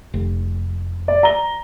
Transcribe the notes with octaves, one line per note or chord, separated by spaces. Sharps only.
F1
D5
A#5 G7